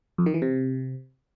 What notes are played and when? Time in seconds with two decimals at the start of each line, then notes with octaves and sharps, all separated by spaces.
0.18 F2
0.26 D#3
0.34 E3
0.42 C3